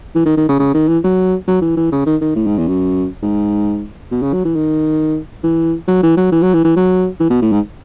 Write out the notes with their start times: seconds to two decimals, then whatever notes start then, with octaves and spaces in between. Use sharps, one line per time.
0.15 E3
0.26 D#3
0.37 D#3
0.49 C#3
0.59 C#3
0.74 D#3
0.88 E3
1.04 F#3
1.48 F#3
1.62 E3
1.77 E3
1.92 C#3
2.06 D#3
2.21 D#3
2.36 A2
2.47 G#2
2.58 E2
2.68 F#2
3.23 G#2
4.12 B2
4.23 C#3
4.33 F#3
4.45 E3
4.56 D#3
5.44 E3
5.88 F#3
6.03 E3
6.17 F#3
6.32 E3
6.43 F#3
6.54 E3
6.64 E3
6.76 F#3
7.20 E3
7.30 B2
7.42 A2
7.52 G#2